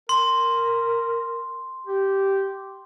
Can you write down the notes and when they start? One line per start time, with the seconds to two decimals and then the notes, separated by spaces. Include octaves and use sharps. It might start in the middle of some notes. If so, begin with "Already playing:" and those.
0.09 A#4 C6
1.87 G4